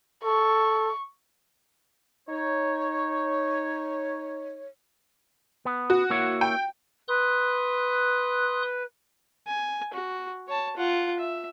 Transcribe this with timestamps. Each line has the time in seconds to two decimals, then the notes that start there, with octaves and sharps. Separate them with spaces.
0.24 A4 C#6
2.29 D#4 C#5
5.65 B3
5.90 F#4
6.10 A#3 E4 C#5
6.41 G5
7.08 B4 C6 D#6 F#6
9.47 G#5
9.94 F#4
10.48 C#5 A5
10.76 F4 F#5
11.19 E5